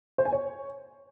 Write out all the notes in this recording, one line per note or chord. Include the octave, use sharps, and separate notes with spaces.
C5
G#5
C#5